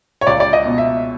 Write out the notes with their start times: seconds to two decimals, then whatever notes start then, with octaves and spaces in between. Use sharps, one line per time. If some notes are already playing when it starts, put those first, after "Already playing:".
0.21 C#5
0.27 C#2 D5
0.40 D5
0.53 D#5
0.65 B2
0.78 E5